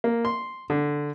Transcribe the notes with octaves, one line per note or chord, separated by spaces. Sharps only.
A#3
C6
D3